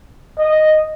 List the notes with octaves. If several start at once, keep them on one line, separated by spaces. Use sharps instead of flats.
D#5